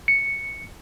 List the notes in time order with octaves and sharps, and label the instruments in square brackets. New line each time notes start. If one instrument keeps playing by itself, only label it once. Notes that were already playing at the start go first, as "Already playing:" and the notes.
[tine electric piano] C#7